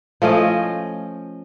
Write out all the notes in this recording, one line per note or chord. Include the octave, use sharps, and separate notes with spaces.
F3 A3 C#4 D#5